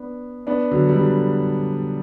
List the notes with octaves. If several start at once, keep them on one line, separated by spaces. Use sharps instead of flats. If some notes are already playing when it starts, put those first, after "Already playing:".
Already playing: B3 D4
B3 D4
D3 F#3
G3
D3 F#3